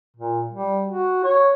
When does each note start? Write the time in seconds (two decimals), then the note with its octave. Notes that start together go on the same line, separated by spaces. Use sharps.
0.16 A#2
0.51 G3
0.88 F#4
1.24 C#5